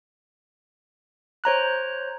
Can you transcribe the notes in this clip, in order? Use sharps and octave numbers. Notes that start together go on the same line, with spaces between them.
C5 C#5 A#5 F#6